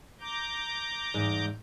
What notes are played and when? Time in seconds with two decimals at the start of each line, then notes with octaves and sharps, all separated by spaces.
0.21 A#5 D6 G6
1.14 E2 G#2